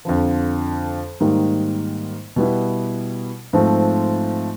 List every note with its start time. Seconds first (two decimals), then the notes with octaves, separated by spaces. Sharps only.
0.05 F2 D3 F3
1.20 G#2 D#3 G3 A#3
2.36 B2 G3 B3 E4
3.53 G#2 F3 A3 C4